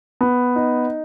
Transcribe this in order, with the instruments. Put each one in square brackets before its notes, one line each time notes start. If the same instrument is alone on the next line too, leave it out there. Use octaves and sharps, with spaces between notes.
[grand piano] B3
D#4